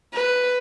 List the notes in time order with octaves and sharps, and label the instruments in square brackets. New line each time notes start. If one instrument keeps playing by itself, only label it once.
[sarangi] B4